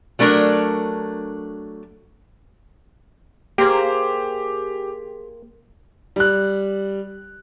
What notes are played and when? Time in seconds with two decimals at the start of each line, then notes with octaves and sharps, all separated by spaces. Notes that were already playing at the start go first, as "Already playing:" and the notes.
0.19 F#3 A3 D4 A#4
3.58 A#3 G4 G#4 C5 G5
6.16 G3 F#6